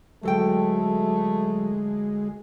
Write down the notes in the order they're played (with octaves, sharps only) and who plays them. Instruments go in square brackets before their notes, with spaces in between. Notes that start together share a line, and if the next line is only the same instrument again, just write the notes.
[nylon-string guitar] D2 A4 G5 [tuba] F#3 [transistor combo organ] G#3 [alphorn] A3